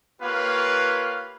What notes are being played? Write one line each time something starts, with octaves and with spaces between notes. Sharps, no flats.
A#3 F4 G4 B4 C#5 F5